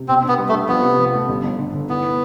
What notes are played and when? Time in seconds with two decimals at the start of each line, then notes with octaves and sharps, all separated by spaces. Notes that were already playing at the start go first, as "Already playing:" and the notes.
Already playing: C3
0.08 B2 C4
0.23 D4
0.28 B3
0.39 G3
0.49 A3
0.53 D4
0.68 F3 B3
0.83 C3
0.99 F3
1.13 A3
1.29 G1
1.43 G1
1.59 D3
1.74 D3
1.89 B3 E4